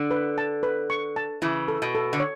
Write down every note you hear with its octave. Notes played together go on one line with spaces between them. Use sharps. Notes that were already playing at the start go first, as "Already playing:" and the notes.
Already playing: D3
B4
A5
B4
C#6
A5
C#3 E3 E4
A4
B2
A4
D3
C#5